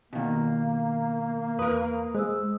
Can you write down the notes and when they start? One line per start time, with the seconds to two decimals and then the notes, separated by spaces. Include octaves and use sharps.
0.13 B2 D#3 A#3
1.59 E2 A#4 B4 D#6
2.15 G#3 C5 D#6 E6